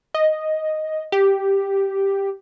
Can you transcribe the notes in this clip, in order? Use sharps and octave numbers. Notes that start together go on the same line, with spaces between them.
D#5
G4